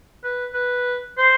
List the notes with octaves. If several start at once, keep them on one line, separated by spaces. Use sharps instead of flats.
B4
B4
C5